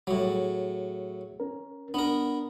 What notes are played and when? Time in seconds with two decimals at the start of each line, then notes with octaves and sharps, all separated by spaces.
0.07 A2 F#3 G3
0.23 G#4
1.40 C#4 A#4
1.94 B3 D4 A#4